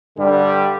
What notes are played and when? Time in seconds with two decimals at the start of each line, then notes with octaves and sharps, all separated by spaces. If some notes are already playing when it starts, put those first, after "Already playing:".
0.17 G2 D3 G3